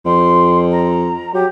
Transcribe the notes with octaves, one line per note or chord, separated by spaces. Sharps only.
F2 C6
A#5
F#3 G4